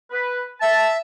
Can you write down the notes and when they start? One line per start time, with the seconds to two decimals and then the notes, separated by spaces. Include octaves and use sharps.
0.11 B4
0.61 E5 A5